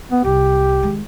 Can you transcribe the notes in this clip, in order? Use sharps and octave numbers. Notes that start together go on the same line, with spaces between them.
B3
C2 G4
D#3 G#3